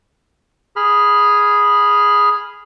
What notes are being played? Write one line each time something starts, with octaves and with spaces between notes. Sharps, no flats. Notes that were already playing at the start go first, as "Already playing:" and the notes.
G#4 B5 F6